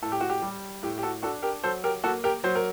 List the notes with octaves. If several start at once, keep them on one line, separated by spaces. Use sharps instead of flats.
A2 A4
G4
F#4
G4
G3
A2 G4
G4
F#4 A4
D4 F#4 A4
G4 A#4
F#3 A4 C5
G4 A#4
A#3 F#4 A4
G4 A#4
F#3 C5
A#4